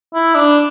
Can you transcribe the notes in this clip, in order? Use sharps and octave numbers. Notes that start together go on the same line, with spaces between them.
E4
D4